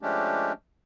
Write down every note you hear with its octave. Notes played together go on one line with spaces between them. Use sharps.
F3 G#3 A3 C#4 D4 G4